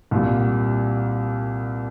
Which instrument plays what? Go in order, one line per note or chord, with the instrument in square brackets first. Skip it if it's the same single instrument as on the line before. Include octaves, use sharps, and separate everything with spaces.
[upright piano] C2 A#2 G3